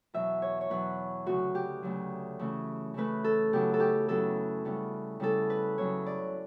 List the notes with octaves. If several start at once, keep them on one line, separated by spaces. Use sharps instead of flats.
E2 B2 F#3 E5
C#5
C#5
E2 B2 F#3 B4
D2 C#3 F#3 F#4
G4
D2 C#3 F#3
C#3 E3 A3 C#4
C#3 E3 A3 C#4 B4
A4
F#2 C#3 F#3 B3 E4 G4
A4
G4
F#2 C#3 F#3 B3 E4 A4
C#3 G3 B3 E4
C#3 G3 B3 E4 A4
B4
F#2 C#3 F#3 B3 E4 C#5
D5